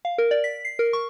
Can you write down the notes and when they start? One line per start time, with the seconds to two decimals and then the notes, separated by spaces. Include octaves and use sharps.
0.05 F5
0.18 A#4
0.31 D5
0.44 B6
0.65 C7
0.79 A#4
0.93 C#6